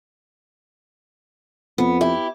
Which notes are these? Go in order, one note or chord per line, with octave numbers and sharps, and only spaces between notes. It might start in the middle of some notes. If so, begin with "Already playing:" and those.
F2 B3
E4 G4